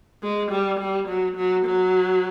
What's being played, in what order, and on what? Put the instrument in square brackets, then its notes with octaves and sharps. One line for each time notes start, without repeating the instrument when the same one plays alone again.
[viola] G#3
G3
G3
F#3
F#3
F#3